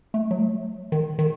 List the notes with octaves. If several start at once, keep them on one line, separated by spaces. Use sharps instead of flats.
A3
F#3
A3
D#3
D#3